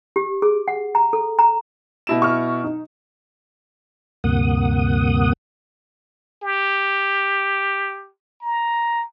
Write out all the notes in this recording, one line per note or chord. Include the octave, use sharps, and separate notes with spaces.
G4
G#4
F#5
A#5
A4
A#5
B2 E4 E7
C#6 F6
D#4
D2 G2 C3 A#3 F#5 D#6
G4
A#5